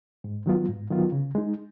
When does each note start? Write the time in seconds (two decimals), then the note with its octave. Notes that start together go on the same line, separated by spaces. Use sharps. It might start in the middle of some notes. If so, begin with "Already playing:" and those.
0.24 G#2
0.46 D#3 F#3 B3 F4
0.69 G#2
0.90 D#3 F#3 B3 F4
1.12 C#3
1.35 G#3 D#4